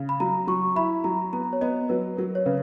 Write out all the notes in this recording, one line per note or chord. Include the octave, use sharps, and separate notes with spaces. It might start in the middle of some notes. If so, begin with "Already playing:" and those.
Already playing: C#3
B5
F#3 A#5
F#3 C#6
E4 B5
F#3 A#5
B3 A#5
C#5
B3 D#5
F#3 B4
F#3 A#4
C#5
C#3 B4